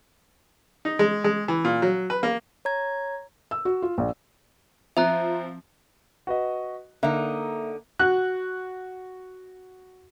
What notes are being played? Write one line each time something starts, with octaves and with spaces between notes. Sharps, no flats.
D#4
G#3
G#3
E3
A#2
F#3
B4
A#3
C#5 A#5 G#6
E6
F#4
F4
A#1
F3 C4 E5 A#5 F#6
F#4 B4 D#5
D3 A#3 D#4 E5 A#5
F#4 F#6